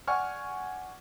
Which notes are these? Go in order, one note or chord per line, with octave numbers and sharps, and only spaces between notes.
D5 F#5 G#5 C#6 F6